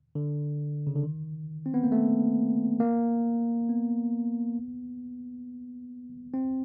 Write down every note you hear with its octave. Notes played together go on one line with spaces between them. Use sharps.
D3
C#3
D3
D#3
C4
B3
A#3
A3
A#3
B3
C4